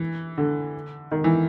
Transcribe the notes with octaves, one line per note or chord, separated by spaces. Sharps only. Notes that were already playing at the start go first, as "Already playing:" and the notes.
Already playing: E3
D3
D#3
E3